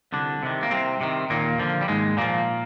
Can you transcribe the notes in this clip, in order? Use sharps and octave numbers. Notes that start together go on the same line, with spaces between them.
C2 D3 D4
C3 D#3
A#3
C2 C3 C4
C3 D#3
D#2 A#2 A#3
D3 F3
G3
D#2 G#2 G#3
A#2 D3 F3 A#3